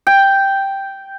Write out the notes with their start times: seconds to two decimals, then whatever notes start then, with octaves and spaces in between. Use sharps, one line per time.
0.07 G5